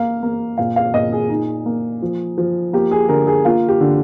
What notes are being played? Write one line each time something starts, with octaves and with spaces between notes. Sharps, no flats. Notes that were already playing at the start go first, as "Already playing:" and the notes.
Already playing: A#3 F5
A#3
A#2 F5
F5
A#2 D#5
G#4
D#4
A#3
F3
F3
A#3 G4
G#4
D3 A#4
G#4
A#3 F4
G4
D3